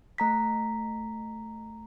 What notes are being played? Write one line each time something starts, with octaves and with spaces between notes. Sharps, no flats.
A3 A#5 B6